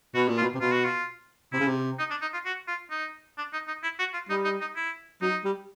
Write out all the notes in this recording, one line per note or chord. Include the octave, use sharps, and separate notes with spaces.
B2 F#4
A#2
F4
B2
C3
B2 F4
F#4
F4
C3 E4
C#3
C3
D#4
D4
D#4
F4
F#4
F4
D#4
D4
D#4
D#4
E4
F#4
F4
G3 D#4
D#4
D#4
E4
F#3 D#4
G3